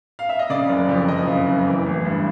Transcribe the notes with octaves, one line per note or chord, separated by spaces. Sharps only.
F5
E5
D#5
C#3 D5
F#1
F2
F#1 D#5
C#3
F#1
E3
A1
G2